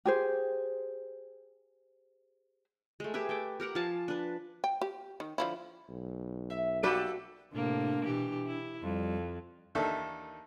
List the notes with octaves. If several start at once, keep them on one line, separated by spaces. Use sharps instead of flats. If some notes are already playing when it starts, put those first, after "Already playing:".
G4 G#4 C5
G#3 A3
G4 G#4 B4 E5
A3 G5 D6
G4 A#4 F#5 A#5
F3 F5 G#5 A5
D4 B4
G5
G4
D#3
D3 F3 E4
B1
E5
A#3 F#4 G4 A4 B4 D5
A2 C3 A#3 D4
B2 E3 G4
E4
F2 G3
D#2 D#3 E3 D4 A4 E5